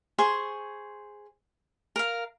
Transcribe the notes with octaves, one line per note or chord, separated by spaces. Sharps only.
G#4 C5 C6 C#6
A#4 F5